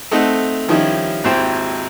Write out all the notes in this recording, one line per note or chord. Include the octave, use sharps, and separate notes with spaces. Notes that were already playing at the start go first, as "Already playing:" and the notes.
A3 C4 D#4 A4 F#5
D#3 F3 G3 C#4 D#4 E4
G#1 D#2 E4 C5 G5